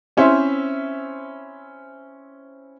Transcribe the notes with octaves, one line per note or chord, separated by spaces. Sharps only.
C4 C#4 E4 C5 E5